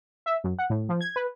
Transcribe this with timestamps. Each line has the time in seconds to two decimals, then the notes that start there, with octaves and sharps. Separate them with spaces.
0.26 E5
0.44 F#2
0.59 F#5
0.70 A2
0.89 F3
1.01 G#6
1.16 B4